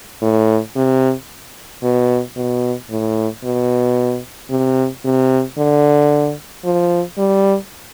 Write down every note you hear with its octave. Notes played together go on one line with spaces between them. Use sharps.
A2
C3
B2
B2
A2
B2
C3
C3
D3
F3
G3